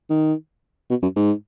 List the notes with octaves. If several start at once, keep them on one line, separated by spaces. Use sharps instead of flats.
D#3
B2
F#2
G#2